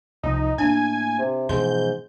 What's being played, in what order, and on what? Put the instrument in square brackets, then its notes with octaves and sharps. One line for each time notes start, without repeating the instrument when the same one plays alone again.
[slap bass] C2 F3 [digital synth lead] D#4
[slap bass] A2 A#3 [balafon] D4 [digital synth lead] G#5
[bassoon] C3
[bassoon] G#2 [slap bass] B2 E3 F3 [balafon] C6 [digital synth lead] G6